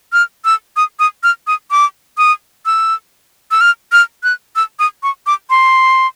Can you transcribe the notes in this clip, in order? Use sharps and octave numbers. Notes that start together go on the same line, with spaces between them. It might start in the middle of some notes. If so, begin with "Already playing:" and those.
F6
E6
D#6
D#6
F6
D#6
D6
D#6
E6
E6
F6
F6
F#6
E6
D#6
C#6
D6
C6